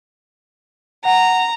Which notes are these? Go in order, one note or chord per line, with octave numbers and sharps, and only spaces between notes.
F#5 A#5